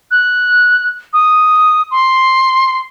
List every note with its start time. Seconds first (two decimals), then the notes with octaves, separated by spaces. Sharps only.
0.11 F#6
1.13 D#6
1.91 C6